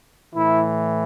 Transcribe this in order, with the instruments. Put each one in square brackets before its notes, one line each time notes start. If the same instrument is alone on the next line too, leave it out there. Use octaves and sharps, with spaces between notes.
[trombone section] A2 E3 E4